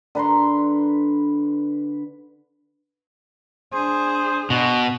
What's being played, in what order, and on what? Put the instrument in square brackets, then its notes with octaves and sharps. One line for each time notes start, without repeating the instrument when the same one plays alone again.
[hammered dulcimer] D3 B4 A#5 C6
[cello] D4 G#4 [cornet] C5
[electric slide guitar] B2 [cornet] F#4